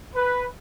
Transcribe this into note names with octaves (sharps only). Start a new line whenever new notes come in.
B4